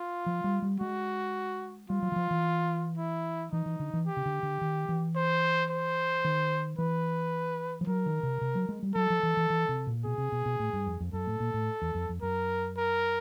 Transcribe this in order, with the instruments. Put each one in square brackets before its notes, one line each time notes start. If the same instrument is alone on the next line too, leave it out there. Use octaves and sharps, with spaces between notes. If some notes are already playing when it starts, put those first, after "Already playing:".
Already playing: [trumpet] F4
[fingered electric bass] F3
G3
G3
[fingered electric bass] G#3 [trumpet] F#4
[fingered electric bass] G3 [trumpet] F4
[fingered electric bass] F#3
E3
F3
E3
[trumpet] E4
[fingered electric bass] E3 [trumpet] D#4
[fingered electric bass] E3
D3
E3
[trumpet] G4
[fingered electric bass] C#3
D3
D3
D#3
E3
[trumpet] C5
C5
[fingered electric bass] D#3
[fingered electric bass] E3 [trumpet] B4
[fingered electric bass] F3
[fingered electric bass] F#3 [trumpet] A#4
[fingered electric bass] D#3
C3
C3
F#3
G#3
G3
[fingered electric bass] F#3 [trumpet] A4
[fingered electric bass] F3
E3
E3
E3
C3
A#2
[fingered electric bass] B2 [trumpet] G#4
[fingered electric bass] C3
B2
B2
A2
G2
F2
F2
[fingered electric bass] F#2 [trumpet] A4
[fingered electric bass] A2
A#2
A2
E2
F2
F2
[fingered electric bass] F#2 [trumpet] A#4
[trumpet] A#4